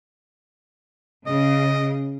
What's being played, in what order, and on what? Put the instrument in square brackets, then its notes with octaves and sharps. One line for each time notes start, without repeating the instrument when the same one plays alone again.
[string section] C#3 [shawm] D#5